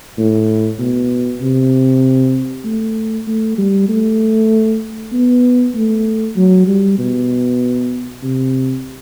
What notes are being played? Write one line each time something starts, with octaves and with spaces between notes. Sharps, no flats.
A2
B2
C3
A3
A3
G3
A3
B3
A3
F#3
G3
B2
C3